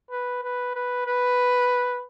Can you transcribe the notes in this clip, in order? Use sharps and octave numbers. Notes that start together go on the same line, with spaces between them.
B4
B4
B4
B4